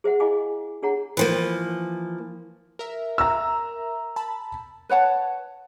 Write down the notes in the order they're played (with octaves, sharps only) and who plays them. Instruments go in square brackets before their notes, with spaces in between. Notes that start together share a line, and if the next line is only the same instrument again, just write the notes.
[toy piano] G#4 C5 E5 F#5
E4 G#4 D#5 F5 G#5 D6
D4 G#4 C#5 F#5 A#5
[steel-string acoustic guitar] E3 F3 A#3
[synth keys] A#4 E5
[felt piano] A#5 E6
[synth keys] A5 B5
[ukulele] B4 C#5 F#5 A5